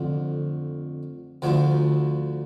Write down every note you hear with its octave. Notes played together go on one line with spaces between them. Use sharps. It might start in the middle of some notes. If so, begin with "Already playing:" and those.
Already playing: F2 D3 A3
D2 D3 F3 A3